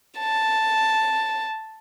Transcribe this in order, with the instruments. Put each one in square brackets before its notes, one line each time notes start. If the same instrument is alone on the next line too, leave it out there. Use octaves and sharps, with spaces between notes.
[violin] A5